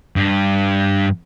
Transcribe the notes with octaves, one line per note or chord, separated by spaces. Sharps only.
G2